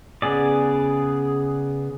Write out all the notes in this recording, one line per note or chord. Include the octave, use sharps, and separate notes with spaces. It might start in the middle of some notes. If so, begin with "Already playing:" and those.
C#3 B3 G#4 D5